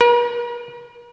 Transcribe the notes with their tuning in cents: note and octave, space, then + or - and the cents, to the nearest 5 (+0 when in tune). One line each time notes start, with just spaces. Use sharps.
A#4 +45